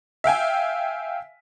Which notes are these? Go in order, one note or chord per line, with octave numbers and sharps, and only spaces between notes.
E5 F5 G5 G#5